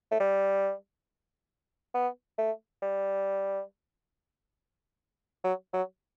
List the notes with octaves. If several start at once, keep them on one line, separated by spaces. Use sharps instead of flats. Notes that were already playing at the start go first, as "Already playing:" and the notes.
A3
G3
B3
A3
G3
F#3
F#3